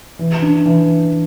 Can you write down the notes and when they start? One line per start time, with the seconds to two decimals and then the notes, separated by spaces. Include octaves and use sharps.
0.19 E3
0.42 D4
0.66 E3